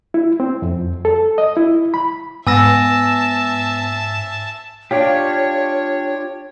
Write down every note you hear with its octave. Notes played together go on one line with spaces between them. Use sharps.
E4
C4
F2
A4
D#5
E4
B5
G#2 B3 E5 G#5 A5 E6 A#6
D4 F4 G4 C#5